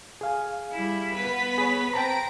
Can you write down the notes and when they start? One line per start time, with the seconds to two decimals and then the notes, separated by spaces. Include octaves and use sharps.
0.21 G#4 F5 G#5
0.72 G3 E4
1.15 B3 B4 B5 B6
1.58 G#4 C#5
1.93 C4 G5 A5 A#5 A#6 D7